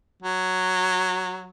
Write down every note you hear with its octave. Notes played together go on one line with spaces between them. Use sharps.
F#3